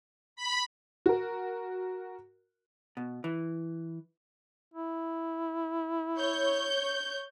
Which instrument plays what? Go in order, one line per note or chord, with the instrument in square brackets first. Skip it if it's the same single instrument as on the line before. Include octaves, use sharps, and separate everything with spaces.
[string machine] B5
[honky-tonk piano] F#4 A#4
[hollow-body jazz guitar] B2
E3
[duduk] E4
[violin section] C#5 G6